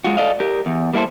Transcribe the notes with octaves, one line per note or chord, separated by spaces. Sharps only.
G#3 F4 F#4
A4 D5 D#5 F5
G4 A#4
E2
G3 A#3 E4 F#4 A4 C5